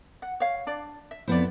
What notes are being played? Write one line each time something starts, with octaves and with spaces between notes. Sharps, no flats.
F#5
C#5 F5
D4 D5
E5
F2 B3 E4 C5 D5